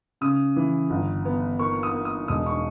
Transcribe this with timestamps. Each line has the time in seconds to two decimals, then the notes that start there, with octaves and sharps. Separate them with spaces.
0.21 C#3 D#6
0.56 E3
0.90 G1
1.25 B3
1.59 A#3 C#6
1.83 D#6
1.94 A#3
2.05 D#6
2.28 E1 D#6
2.46 C#6